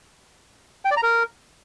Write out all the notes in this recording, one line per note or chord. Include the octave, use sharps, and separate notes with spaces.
G5
D5
A#5
A#4